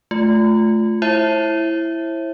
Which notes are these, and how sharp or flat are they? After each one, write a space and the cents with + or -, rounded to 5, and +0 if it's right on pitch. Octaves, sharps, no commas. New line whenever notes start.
A3 -15 F4 +0
E4 +5 C5 +45 E5 +0